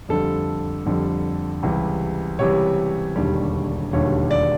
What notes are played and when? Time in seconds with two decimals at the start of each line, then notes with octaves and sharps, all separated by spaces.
0.09 F2 D3 G3 A4
0.86 F2 D3 G3
1.62 C#2 C3 E3 G3
2.39 C#2 C3 E3 G3 C#5
3.16 E1 D#2 D3 G3
3.92 E1 D#2 D3 G3 C#5
4.31 D5